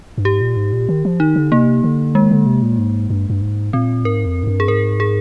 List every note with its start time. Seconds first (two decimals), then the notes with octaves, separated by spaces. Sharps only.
0.18 G2
0.25 G#2 G4
0.41 A#2
0.57 G#2
0.73 A#2
0.89 D#3
1.05 F3
1.20 D#3 D#4
1.36 D3
1.52 C3 A#3
1.84 D3
2.15 D#3 G#3
2.31 D3
2.46 C3
2.62 A#2
2.78 G#2
3.10 G2
3.30 G2
3.42 G#2
3.73 A#2 C4
4.05 G#2 A#4
4.26 F2
4.43 G#2
4.47 G2
4.60 G#4
4.68 G#2 A#4
5.00 G#4